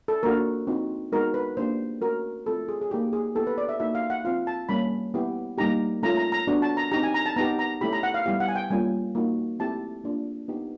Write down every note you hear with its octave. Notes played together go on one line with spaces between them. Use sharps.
A4
A#3 D4 F#4 A#4
C4 D#4 F#4
G#3 B3 D#4 F#4 A#4
B4
A#3 D4 G4 C5
A3 C#4 F#4 A#4
A3 C4 F4 A4
G#4
G#4
A#3 D#4 F#4 G4
G#4
B3 E4 G4 A4
B4
D5
E5
A#3 D#4 F#4 E5
F5
F#5
C4 F4 F5
A5
G3 A#3 C#4 B5
B3 E4 G4
G3 A#3 D#4 G4 A#5
A3 C#4 F4 A#5
A#5
A#5
B3 D4 F#4
A5
A#5
C4 D#4 G4 A#5
G#5
A#5
A5
B3 D#4 G4 A#5
A#5
A3 C#4 E4 G4 B5
A#5
F#5
F5
G3 B3 E4 G4 F5
F#5
G#5
G5
G3 A#3 C#4 F4 G#5
A#3 D#4 F#4
A3 C4 E4 G4 A5
A#3 D4 F4
B3 D#4 G4